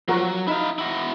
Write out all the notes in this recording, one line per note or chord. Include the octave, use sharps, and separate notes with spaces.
F3 F#3 F#4 A#4
D#4 E4 F5
E4 F#4